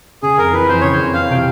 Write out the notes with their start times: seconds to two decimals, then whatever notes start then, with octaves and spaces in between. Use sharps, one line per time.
0.22 C#3 G#4
0.37 F2 A#4
0.53 E3 B4
0.69 F2 C5
0.81 C#3 C#5
0.93 C5
1.00 F2
1.14 E3 F5
1.30 C3 G5